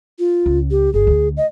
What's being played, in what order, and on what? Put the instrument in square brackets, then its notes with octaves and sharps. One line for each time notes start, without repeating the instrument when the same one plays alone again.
[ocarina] F4
[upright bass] C#2
[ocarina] G4
[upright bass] G1 [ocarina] G#4
[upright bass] D2 D3
[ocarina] D#5